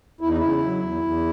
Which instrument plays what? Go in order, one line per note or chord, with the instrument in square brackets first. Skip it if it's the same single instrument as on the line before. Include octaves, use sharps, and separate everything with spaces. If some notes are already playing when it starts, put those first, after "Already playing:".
[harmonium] E2 E4
D#4
C#3 E4
F#3
E2
E2